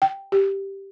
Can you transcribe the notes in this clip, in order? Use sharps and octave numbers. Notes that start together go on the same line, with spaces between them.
G5
G4